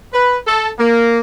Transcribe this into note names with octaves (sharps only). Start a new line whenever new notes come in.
B4
A4
A#3